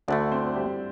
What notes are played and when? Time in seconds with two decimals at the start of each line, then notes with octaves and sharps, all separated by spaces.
0.08 D2 D3 A3 D4 D5
0.32 C4 C5
0.55 G3 G4